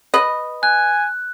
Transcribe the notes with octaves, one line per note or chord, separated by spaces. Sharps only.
B4 D#5
G#5 F#6